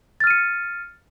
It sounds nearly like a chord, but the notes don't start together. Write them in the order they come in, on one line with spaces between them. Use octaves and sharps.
A6 F6 D#7 C#7